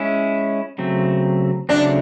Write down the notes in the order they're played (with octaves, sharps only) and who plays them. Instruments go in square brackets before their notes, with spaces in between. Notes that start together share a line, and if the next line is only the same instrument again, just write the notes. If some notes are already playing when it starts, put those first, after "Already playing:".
Already playing: [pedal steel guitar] G#3 C#4 E4
C#3 F#3 A3 C4
[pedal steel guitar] C#3 F#3 A3 C4 [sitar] D4